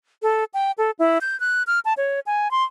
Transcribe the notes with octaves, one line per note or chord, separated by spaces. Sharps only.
A4
G5
A4
E4
G6
F#6
F6
A5
C#5
G#5
C6